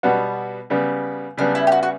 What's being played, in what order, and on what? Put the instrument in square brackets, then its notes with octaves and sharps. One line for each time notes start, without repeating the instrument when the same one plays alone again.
[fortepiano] B2 G3 B3 F#4
C#3 G3 B3
[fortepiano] C#3 G3 B3 [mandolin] D4
[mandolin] E4
G4
F#4
F#4